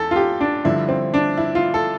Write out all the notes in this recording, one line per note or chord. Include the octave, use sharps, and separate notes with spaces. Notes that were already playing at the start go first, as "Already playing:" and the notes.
Already playing: E2 A4
F4
G4
D4
G2 D3 F3 E4
C4
D4
E4
F4
A4